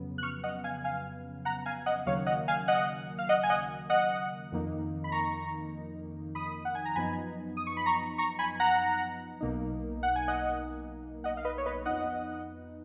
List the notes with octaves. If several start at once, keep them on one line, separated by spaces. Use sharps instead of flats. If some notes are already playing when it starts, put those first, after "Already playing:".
Already playing: F2 C#3 F#3 B3
F#6
C#6 F6
D#5 F#5
F5 G#5
F5 G#5
F#5 A#5
F5 G#5
D#5 F#5
D#2 C#3 F#3 A#3 C#5 F5
D#5 F#5
F5 G#5
D#5 F#5
F5
D#5 F#5
G#5
D#5 F#5
D#5 F#5
F2 D#3 A#3 D#4
B5
A#5 C#6
B5 D#6
F#5
G#5
A#5
F#2 F3 B3 D#4 G#5 B5
D#6
C#6
B5
A#5 C#6
A#5 C#6
G#5 B5
F#5 A#5
B1 B2 A#3 D#4
F#5
G#5
D#5 F#5
D#5 F#5
F5
B4 D#5
C#5
B4 D#5
F2 F3 B3 D#4 D#5 F#5